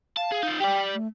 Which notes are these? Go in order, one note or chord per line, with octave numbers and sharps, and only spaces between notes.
F5 A5
G#4
D#4 F4
G4 D5 G5
A3